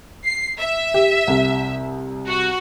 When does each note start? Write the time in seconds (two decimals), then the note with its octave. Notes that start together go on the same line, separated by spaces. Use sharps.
0.25 C7
0.59 E5
0.94 G4
1.27 C2 C3
2.28 F#4